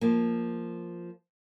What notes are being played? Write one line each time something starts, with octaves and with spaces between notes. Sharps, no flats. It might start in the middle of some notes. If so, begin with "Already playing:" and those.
F3 A#3